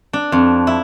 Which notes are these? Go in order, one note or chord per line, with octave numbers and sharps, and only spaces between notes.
D4
F2
E4